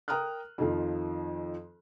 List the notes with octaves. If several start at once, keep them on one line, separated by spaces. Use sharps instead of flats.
A#4 G5 A#5 D#6 F6 F#6
F2 D#3 F3